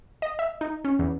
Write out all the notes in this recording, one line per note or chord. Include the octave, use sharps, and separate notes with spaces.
D#5
E5
D#4
C#4
E2